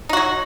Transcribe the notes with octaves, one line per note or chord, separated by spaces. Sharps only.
F#3 D#4 F#4